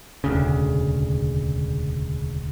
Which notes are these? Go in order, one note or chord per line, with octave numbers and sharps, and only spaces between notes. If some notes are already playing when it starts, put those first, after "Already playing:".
E1 D2 C#3